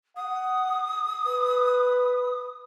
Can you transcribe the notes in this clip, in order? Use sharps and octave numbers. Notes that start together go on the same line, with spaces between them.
F#5 D#6
B4